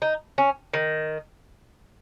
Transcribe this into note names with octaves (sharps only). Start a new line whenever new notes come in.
D#4
C#4
D#3